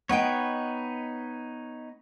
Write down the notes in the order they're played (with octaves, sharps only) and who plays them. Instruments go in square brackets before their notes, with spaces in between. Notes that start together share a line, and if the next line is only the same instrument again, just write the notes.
[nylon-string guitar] B3 D#5 G5 [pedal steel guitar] D#4 B4 C#5